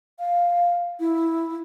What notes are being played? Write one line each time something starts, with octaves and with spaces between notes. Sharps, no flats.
F5
E4